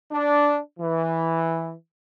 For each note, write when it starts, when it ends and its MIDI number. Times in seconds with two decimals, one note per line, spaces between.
0.12 0.58 62
0.79 1.72 52